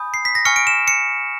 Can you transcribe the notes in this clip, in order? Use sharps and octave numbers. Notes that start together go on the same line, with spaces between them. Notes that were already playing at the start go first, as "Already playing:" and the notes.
Already playing: G#5 B5 D#6 G6
C7
B6
A#6
G#5 C#6 F6 C#7
D7
E7
C#7